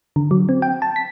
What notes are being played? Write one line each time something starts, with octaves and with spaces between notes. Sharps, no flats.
D3
F#3
C4
G5
A5
B6